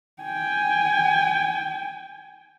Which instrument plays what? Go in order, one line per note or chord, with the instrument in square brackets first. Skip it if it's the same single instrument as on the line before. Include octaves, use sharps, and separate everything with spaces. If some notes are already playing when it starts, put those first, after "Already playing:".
[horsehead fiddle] G5 G#5